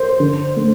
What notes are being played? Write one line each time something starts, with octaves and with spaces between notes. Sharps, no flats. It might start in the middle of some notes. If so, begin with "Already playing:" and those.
Already playing: C5
D3
A3